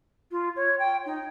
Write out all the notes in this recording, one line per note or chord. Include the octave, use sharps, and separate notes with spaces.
F4
C#5
G5
D#4